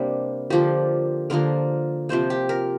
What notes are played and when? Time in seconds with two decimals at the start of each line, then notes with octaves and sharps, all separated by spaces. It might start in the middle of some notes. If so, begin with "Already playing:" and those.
Already playing: C3 G3 A#3 D4
0.50 D3 F3 A#3 G4
1.30 D3 F3 A#3 A#4
2.09 C3 F3 A#3 C5
2.30 G4
2.49 A#4